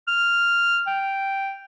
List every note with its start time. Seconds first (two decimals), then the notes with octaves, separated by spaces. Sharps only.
0.07 F6
0.87 G5